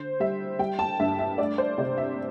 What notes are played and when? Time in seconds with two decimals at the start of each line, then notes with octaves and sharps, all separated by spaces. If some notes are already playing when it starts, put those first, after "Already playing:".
Already playing: D3 C5
0.20 G3 E5
0.59 G3 G5
0.79 A5
0.99 G2 E5
1.19 E5
1.38 A3 D5
1.58 C5
1.78 C3 D5
1.98 E5